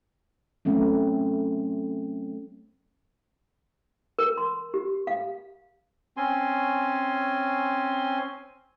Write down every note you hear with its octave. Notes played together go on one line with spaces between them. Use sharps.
F#3 A3 C4 C#4
A#4
C6
G4
F5
C4 C#4 G#5 C6